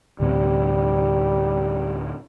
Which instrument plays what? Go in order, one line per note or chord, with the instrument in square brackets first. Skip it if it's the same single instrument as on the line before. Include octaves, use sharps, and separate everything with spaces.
[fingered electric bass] D2 A2 C3 [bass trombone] G3